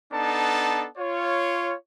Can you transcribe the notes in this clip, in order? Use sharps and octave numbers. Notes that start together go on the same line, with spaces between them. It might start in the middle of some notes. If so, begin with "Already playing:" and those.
B3 D4 D#4 A4 A5
F4 C#5